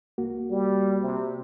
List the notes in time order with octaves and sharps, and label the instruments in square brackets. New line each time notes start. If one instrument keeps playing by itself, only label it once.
[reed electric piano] C2 A#3 F#4
[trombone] G3
C3